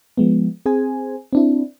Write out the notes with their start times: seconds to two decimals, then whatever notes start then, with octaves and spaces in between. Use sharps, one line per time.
0.18 F3 G#3 B3
0.66 C4 G#4 C5 G#5
1.33 C4 D4 E4